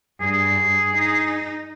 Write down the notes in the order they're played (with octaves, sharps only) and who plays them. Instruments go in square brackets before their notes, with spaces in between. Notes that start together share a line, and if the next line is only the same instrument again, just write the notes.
[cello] G2 [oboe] G#4
[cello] D#4